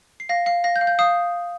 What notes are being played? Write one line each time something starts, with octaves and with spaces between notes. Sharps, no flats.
C7
F5 A#6
F5 C7
F5 A#6
G6
F5
G6
F5 D#6